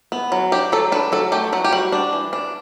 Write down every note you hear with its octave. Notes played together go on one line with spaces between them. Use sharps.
B3
F#3
D4 G4
F#3 A4
D4 B4
F#3 A4
A3 G4
F#3 F#4
G4
G3 F#4
D4
E3
D4